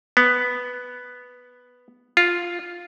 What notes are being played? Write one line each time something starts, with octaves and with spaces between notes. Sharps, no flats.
B3
F4